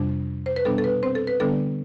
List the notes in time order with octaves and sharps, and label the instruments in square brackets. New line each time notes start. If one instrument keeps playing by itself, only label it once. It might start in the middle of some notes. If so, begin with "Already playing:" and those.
Already playing: [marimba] F2 C3 G3 D4
C5
B4
B2 G3 B3 D4 A4
A4
B4
C4 C5
A4
B4
D3 G3 B3 D4 A4